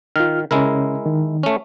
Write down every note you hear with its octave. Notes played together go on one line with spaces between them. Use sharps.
D#3 F4 F6
C#3 G#3 C#4 E4 A#4
D#3
A3 C#4